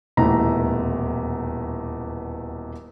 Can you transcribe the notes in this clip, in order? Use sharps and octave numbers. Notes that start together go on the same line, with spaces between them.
D#1 E2 B2 A3 A#5